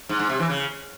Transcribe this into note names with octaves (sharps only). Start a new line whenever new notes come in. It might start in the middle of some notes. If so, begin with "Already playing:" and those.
G#2
G#2
C3
E3
C#3